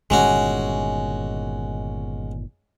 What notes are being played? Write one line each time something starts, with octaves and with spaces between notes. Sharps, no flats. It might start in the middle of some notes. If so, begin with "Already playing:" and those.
G1 A#2 D#3 G#3 C#4 F#4